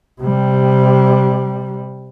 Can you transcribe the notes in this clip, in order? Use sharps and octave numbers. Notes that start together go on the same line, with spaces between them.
C3 G3